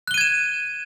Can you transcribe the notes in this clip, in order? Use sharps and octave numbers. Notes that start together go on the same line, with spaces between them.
F#6 G#6 D#7 E7 G7